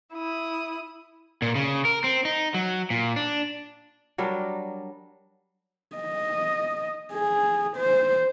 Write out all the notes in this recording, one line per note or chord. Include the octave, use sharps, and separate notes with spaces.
E4 D#6
A#2
C#3
A#4
C4
D#4
F#3
A#2
D4
F#3 G3 D4 A#4
D#5
G#4
C5